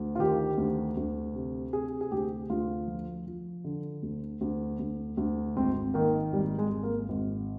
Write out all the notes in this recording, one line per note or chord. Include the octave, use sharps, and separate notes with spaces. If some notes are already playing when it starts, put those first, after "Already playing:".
Already playing: D2
F4
D#3 G4
D2
D2
C3
C3 G#4
G#4
D2 G4
D2 F4
F3
F3
D3
D2
D2
D2
D2
G#1 C4
D#3 A#3
G#1 G3
G#3
G#1
A#3
G#1